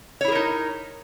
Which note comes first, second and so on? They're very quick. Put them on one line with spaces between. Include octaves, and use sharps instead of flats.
C#5 E4 G#4 A#4 D#4